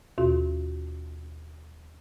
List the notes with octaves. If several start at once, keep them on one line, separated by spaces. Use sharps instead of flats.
D#2 B2 F4 F#4